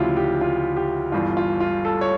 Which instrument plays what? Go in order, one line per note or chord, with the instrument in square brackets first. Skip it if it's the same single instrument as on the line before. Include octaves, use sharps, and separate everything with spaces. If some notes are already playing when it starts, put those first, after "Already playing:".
Already playing: [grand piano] D2 C#3 F3 E4 F4 G4
G4
F4
G4
G1 G2 E3 F4
F4
F4
A4
C#5